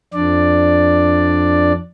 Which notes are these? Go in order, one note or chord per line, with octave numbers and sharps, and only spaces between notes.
F2 D4 D5